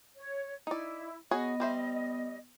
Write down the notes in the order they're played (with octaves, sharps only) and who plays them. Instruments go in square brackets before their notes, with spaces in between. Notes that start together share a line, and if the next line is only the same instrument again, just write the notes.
[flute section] C#5
[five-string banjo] D#4 D5 [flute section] E4
[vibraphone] B3 [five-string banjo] F#4 G#4 C#5 [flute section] D#5
[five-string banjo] G3 C5 E5